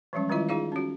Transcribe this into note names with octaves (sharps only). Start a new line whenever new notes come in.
E3 F3 G3 G#3 C#4
D#3 G3 G#3 E4 F4 D#5
D#4 F4 G#4 D5 F5
C#4 F#4